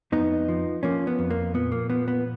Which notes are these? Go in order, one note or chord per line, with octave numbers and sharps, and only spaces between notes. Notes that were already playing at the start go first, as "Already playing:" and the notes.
F2 B3 D#4
F3
F3 A#3 C#4
B3
F2
A#3
A#2 B3
A#3
F3 B3
B3